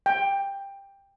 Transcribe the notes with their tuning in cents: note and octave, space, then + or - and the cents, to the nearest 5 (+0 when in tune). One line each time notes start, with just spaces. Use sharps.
G5 +15